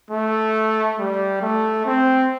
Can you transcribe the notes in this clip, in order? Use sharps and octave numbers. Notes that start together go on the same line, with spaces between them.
A3
G3
A3
C4